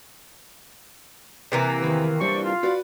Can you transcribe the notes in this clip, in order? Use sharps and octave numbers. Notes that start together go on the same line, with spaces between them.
C3 E3 A#3
E2 A#2 D#3 B4
G3 D4 C5 D5 C#6
F4 F5
F#4 B4 D5